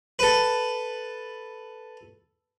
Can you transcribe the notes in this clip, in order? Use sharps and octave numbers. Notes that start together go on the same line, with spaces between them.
A4 B4